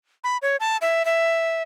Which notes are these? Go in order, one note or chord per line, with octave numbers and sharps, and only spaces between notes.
B5
C#5
A5
E5
E5